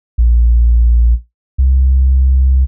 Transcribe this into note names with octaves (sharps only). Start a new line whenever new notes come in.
A#1
C2